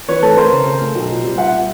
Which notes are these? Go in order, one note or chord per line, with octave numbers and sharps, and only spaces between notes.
E3 B4 C#5
A3 A4 B4
A3 A#4 C5
C#3
C#3
A3
B1
A#2
G3
A#2 E5 F#5
G3